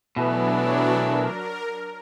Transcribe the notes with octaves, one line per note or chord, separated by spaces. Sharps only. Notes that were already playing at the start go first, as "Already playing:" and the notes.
B2 E3 F#3 A3 B3 D4
A#4